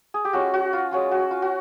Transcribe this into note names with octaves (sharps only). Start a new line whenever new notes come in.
G#4
G4
G#3 C#4 F4 F#4
F#4
F4
G#3 C#4 F4 F#4
F#4
F4
F#4